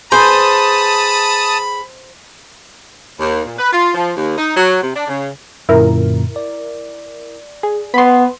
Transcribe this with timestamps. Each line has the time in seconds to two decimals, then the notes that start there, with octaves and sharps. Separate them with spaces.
0.12 G#4 B4 C5 A5 B5 D#6
3.20 D#2
3.45 A#2
3.58 B4
3.73 F4
3.95 F3
4.17 D#2
4.37 D#4
4.56 F#3
4.82 C3
4.95 D4
5.07 C#3
5.69 F#2 A#2 D3 E4 A#4
6.36 D5
7.63 G#4
7.94 B3 B5 C6